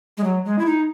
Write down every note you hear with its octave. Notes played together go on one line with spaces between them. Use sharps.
G#3
F#3
G#3
E4
D#4